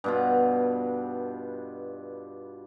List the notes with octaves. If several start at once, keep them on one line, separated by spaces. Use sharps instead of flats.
G2 B2 F4